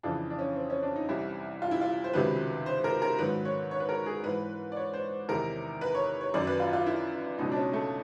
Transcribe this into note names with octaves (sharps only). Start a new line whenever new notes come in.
F2 C#3 E3 D4
D4
C#4
C4
C#4
D4
D#4
C2 C3 E3 E4
F4
E4
F4
C5
C#2 C3 D#3 F#3 B4
C5
A#4
A#4
G#2 D#3 F#3 B4
C#5
C#5
B4
A#4
G#4
G#2 E3 B4
D5
C#5
C5
E2 C3 D#3 A#4
B4
C#5
C#5
F#2 D#3 F#3 D5
B4
F4
F4
E4
C#2 B2 F#3 D#4
D4
C#4
A3